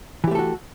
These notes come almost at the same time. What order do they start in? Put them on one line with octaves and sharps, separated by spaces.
E3 G4 A3 A4 F#4